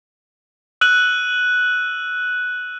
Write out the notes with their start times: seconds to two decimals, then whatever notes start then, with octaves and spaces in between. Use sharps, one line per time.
0.81 E6 F#6 D#7 F#7